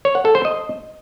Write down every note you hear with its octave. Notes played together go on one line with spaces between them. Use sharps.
C#5
F#5
A4
C5
D#5